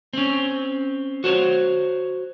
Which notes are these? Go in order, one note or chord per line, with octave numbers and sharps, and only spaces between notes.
C4 C#4
F#4 C5 C#5